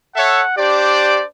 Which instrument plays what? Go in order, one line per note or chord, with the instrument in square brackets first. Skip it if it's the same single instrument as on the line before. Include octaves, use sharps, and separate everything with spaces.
[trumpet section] A4 C#5 E5 [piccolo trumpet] F#5
[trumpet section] D4 C5 D5 [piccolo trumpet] G4